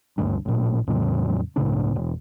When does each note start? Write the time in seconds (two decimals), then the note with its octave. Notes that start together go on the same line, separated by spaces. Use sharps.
0.18 G#1 D2 G2 D4
0.45 A1 A#2
0.87 E2 A2 C#3 F#3
1.56 C#2 A2 C#3 D4
1.95 E1